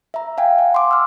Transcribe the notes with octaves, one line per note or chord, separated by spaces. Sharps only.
E5 A#5
F5 G5 G#5
F#5
C6 D6
E6 F6